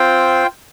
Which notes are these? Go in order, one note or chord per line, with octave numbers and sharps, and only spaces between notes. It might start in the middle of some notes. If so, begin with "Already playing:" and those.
Already playing: C4 F4 C5 G5